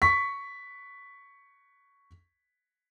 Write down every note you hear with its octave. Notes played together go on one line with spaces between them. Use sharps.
C#6 B6